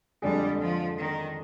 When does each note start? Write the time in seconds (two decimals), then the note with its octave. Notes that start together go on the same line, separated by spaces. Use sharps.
0.22 F2 D3 G3 G#3 D4 G#4
0.61 F3
0.98 D#3